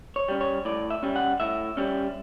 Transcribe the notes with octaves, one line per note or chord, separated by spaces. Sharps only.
C#5
G3 C#4
C#5
A2 D5
E5
G3 C#4
F#5
A2 E5
G3 C#4